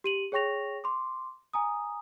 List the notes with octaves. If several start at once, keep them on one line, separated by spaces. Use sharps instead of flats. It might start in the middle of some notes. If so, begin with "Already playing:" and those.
G4 D#7 F#7
G#4 C#5 G5 C#6 A#6 F7
C6 D6
G#5 A#5 D#6